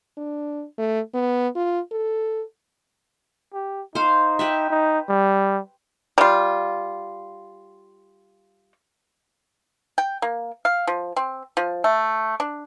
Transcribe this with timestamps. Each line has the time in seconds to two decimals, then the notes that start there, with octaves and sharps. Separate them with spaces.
0.17 D4
0.78 A3
1.14 B3
1.55 F4
1.92 A4
3.53 G4
3.95 D#4 C5 F5
4.39 G4 B4 E5
4.70 D#4
5.09 G3
6.18 G3 F4
9.98 G5
10.22 A#3
10.65 F5
10.87 F3
11.16 C4
11.57 F3
11.84 A3
12.40 D4